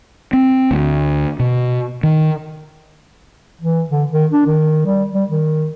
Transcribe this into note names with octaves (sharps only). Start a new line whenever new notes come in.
C4
D2
B2
D#3
E3
D3
D#3
D4
D#3
G3
G3
D#3